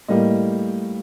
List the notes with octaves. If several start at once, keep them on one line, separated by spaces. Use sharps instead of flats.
A2 G3 A#3 D#5